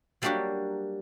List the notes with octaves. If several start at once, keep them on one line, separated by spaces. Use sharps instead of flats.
F#3 G3 A#3 D4 F#4 G4